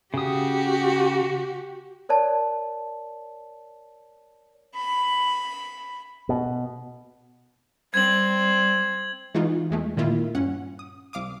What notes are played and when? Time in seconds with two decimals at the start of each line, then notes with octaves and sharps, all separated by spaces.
0.14 C#3 F#4 G4 D#6
2.09 A#4 C#5 D5 A5
4.74 B5
6.29 B2
7.94 G3 C4 G#6 F#7
9.34 E3 G#3 D#4 F4 F#4
9.71 E2 G#3 A3
9.97 A#2 D#3 A#3 E4 F4
10.35 G2 C#4 F#5
10.79 D#6
11.13 C2 F5 D6 D#6